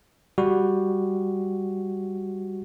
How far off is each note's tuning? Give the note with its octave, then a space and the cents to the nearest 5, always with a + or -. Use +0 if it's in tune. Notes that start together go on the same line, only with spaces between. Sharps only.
G3 +5 F#4 +0